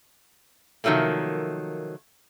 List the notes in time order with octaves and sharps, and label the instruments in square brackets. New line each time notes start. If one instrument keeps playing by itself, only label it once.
[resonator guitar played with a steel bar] C3 D#3 F3 F#3 A3 A#3